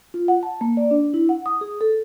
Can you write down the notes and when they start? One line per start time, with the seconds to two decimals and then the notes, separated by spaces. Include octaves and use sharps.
0.14 F4
0.28 F#5
0.43 A5
0.61 A#3
0.77 D5
0.91 D4
1.14 E4
1.29 F#5
1.46 D#6
1.61 G#4
1.81 A4